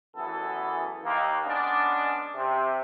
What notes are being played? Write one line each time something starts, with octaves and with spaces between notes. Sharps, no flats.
A1 F#2 E3 B3 G#4 A4
D#2 A#3
G#3 B3 C#4 D4
C3